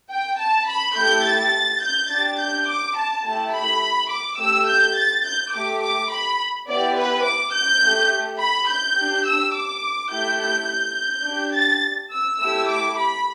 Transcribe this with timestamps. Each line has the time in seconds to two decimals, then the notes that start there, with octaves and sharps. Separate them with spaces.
0.11 G5
0.40 A5
0.68 B5
0.96 A3 E4 G4 G6
1.25 A6
1.82 G6
2.10 D4 G4 A6
2.39 G6
2.68 D6
2.97 A5
3.25 A3 E4 G4 A5
3.54 B5
4.11 D6
4.39 A3 G4 E6
4.68 G6
4.96 A6
5.25 G6
5.53 A3 G4 D6
5.82 D6
6.11 B5
6.68 B3 E4 G4 D5
6.97 B4
7.25 D6
7.53 G6
7.82 A3 G4
8.40 B5
8.68 G6
8.96 D4 G4
9.26 E6
9.54 D6
10.11 A3 E4 G4 G6
10.39 G6
10.68 G6
11.25 D4 G4
11.54 A6
12.11 E6
12.39 A3 E4 G4 E6
12.68 D6
12.97 B5